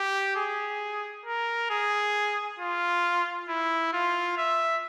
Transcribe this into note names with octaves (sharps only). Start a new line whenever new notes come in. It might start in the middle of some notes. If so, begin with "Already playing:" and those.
Already playing: G4
G#4
A#4
G#4
F4
E4
F4
E5